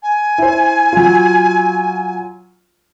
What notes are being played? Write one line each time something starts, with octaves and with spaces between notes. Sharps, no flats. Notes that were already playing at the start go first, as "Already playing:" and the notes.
G#5
E4 C5
F#3 F4